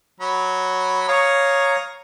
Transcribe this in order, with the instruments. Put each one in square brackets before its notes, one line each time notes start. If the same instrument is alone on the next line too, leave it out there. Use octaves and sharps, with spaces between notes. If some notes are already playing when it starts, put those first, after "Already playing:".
[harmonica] F#3 B5
[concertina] C#5 F5 [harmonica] A#5 C#6 D#6